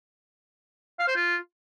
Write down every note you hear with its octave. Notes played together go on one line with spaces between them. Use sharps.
F5
C5
F4